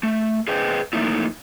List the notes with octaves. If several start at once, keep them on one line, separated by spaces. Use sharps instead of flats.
A3
G#4 B4 C5 D#5 G5
F2 A3 A#3 D#4 E4